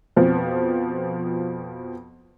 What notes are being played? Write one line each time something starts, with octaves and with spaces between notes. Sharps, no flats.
F2 B2 F3